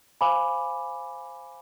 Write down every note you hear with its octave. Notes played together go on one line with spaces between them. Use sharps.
C5 F5 G#5 B5 D6